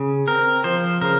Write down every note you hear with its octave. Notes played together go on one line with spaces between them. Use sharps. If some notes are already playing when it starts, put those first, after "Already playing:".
Already playing: C#3
C4 A#4
F3 C5
C#3 A#4